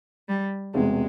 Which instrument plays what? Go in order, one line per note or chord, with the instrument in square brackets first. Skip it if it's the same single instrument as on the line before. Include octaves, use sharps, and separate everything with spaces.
[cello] G3
[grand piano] E1 E2 C3 [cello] G#3